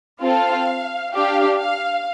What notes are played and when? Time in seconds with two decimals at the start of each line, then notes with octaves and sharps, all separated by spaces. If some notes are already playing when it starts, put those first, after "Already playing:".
0.22 C4 F4 A4 F5
1.14 D4 G4 F5
1.60 F5